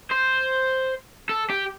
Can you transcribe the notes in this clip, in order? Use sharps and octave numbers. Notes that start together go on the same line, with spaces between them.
C5
A4
G4